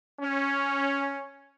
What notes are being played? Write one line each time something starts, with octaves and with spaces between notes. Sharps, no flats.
C#4